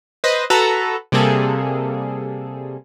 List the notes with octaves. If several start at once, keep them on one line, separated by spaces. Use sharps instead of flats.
B4 C5 D#5
F#4 A4 B4 A#5
C3 G3 A#3 G#4 A4